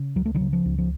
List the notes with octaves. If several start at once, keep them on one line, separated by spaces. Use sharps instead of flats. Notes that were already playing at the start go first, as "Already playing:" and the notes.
Already playing: C#3
C#2 F#3
A3
D#3 F#3
C#3
F3
C#2
F3